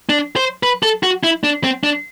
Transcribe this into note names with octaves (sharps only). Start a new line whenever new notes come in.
D4
C5
B4
A4
F#4
E4
D4
C4
D4